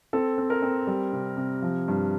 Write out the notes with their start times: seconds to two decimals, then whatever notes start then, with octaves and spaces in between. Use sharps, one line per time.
0.13 C4 A4
0.38 C4
0.50 A#4
0.62 C4
0.87 G3
1.13 C3
1.37 C3
1.62 F3
1.88 G2